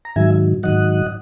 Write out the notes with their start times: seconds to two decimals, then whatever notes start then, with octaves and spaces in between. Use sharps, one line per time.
0.05 A#5
0.16 G#2 D#3 F#3 E5 G#5
0.63 G#2 D#3 F#3 D#5 F#5